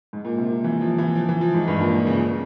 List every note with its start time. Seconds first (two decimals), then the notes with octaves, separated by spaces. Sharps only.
0.13 G#2
0.25 A#2
0.38 C3
0.64 E3
0.81 F3
0.98 E3
1.15 F3
1.29 E3
1.41 F3
1.54 G#2
1.68 G2
1.80 A#2
2.07 C#3
2.20 C#3